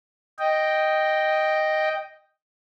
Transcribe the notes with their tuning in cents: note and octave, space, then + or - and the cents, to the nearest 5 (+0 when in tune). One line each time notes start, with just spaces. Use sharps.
D#5 +0 G5 +0